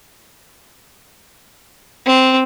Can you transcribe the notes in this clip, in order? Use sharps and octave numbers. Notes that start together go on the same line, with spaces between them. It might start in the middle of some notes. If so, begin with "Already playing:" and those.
C4